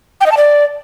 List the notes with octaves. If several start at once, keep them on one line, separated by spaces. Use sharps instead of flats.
G5
D#5
A5
D5